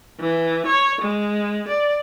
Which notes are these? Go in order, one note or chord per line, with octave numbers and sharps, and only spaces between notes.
E3
C#5
G#3
D5